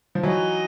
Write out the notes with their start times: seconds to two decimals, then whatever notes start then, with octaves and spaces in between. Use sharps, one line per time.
0.15 F3
0.23 E3 F#3 D#4 D#5